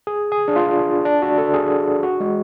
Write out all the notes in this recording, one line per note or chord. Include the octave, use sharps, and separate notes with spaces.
G#4
G#4
D4
F4
D4
F#4
A4
G#4
F#4
G#3